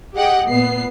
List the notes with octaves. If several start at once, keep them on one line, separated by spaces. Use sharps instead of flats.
G4 G#4 D#5 F#5 G5
A#2 B3 C7